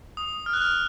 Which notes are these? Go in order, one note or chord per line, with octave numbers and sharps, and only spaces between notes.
D#6
F6
F#6
F6